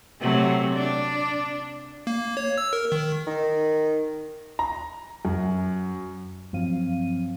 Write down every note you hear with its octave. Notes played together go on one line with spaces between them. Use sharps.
C3 F#3 A3
D4
A#3
C#5
E6
A#4
D#3
D#3
A#5
F#2
G2 F3 F#3 C4 F5 D#7